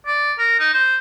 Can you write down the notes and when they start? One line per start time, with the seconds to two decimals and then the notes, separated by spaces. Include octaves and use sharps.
0.07 D5
0.39 A#4
0.59 D#4
0.73 C5